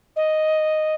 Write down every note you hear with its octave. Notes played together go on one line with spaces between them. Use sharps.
D#5